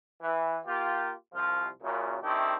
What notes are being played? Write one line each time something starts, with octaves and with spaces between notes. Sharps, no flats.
E3
A#3 F4 G4
C2 F3 F4
F#2 A#2 C#3
D#3 A3 C4 D4 E4 G4